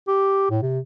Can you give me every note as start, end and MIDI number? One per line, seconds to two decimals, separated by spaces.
0.08 0.49 67
0.50 0.60 45
0.62 0.80 48